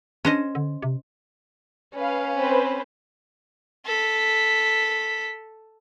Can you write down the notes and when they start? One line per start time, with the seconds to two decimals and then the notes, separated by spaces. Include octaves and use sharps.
0.25 C#4 D4 C5 D#5
0.55 D3
0.82 C3
1.95 C#4 B4 F5
2.35 C4 B4 C5
3.86 A4 B6